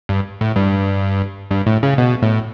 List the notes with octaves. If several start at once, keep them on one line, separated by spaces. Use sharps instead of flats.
G2
A2
G2
G2
A2
C#3
B2
A2